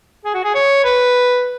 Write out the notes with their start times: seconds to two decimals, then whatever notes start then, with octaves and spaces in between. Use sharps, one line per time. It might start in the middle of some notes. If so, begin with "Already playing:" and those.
0.25 G#4
0.34 F#4
0.44 G#4
0.54 C#5
0.85 B4